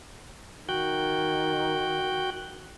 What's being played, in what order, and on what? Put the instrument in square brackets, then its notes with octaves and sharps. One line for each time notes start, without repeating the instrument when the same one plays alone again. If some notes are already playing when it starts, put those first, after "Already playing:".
[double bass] D#3 [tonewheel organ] F#4 G5